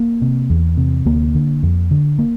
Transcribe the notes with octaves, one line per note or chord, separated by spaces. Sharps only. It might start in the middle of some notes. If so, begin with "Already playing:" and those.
Already playing: A#3
C3
E2
C3
D2 A#3
D3
F2
D3
A#3